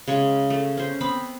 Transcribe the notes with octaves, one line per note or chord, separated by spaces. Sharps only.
C#3 G#3 C#5
A3
C#4 C5
B3 C4 B5